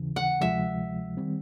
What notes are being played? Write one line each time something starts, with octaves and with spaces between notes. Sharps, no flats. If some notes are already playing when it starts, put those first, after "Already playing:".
Already playing: D#2 C#3 E3
F#5
D2 C3 F3 G#3 E5
D#3 G3 C4